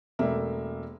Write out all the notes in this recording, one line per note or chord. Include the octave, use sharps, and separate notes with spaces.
E1 A3 A#3 E5